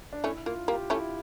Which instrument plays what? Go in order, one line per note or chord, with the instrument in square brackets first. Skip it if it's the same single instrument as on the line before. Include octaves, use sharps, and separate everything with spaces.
[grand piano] D4
[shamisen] A3 C#4 [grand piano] E4
[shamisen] A#3 [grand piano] F4
[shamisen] A#3 [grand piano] G4
[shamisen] A3 C#4 [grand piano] E4